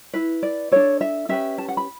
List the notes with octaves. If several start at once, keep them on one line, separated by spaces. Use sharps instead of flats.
E4 B4
D5
D4 A4 C#5
E5
C#4 G4 B4 E5
A5
F#5
B5